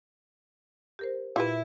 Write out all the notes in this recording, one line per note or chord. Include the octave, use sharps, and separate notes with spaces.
G4 A#4 C5
A#2 E4 F4 G4 B4